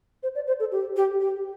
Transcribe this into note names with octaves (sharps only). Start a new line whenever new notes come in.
C5
D5
C5
A4
G4
G4
G4